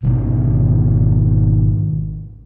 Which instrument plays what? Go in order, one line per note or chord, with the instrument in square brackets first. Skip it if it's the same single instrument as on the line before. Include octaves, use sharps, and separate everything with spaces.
[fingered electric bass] G#1 B2 D#3 C#4